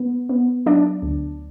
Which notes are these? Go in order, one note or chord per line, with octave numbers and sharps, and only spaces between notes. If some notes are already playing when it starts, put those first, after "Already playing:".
Already playing: B3
B3
F#3 D4 D5
D2